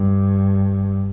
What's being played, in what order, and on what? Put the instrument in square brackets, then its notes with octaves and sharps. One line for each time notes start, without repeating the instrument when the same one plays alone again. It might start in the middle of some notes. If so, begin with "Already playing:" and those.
Already playing: [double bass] G2